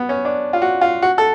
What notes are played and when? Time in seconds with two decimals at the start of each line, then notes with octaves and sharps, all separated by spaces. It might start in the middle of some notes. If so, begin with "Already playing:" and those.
Already playing: B3
0.09 C#4
0.25 D4
0.53 F4
0.62 F#4
0.81 F4
1.02 F#4
1.18 A4